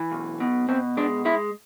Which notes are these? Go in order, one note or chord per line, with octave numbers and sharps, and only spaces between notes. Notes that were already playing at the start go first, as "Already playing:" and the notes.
Already playing: E3
B1
B2
B2 C4
G#3 D4
G#3 E4